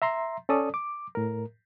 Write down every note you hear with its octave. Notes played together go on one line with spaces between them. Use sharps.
E5 A#5 C6
C#4 A4 D5 D#6
D6
A2 A#4